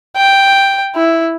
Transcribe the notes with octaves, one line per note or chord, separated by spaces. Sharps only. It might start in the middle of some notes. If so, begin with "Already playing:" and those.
G5
E4